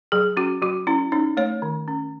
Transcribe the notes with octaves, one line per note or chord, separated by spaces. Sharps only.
F#3 G#4
C#4 F#4
F#3 F#4
C#4 E4
C#4 D#4
A3 C#5
D#3
C#4